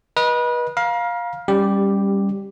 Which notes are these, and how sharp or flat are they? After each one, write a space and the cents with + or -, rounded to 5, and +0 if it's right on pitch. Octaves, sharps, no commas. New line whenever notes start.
B4 -30 D#5 +0
F5 +10 A#5 +40
G3 +15 C#4 +0 G4 +0